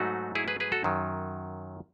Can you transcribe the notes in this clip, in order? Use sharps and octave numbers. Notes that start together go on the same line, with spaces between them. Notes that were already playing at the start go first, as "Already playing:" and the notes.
Already playing: G#2 F#3 A3 D#4 F#4
E4 G#4
G#4 B4
G#4 B4
F#4 A4
F#2 D#3 F#3